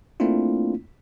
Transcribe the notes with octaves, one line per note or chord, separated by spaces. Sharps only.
A3 A#3 C4 D4 E4 F4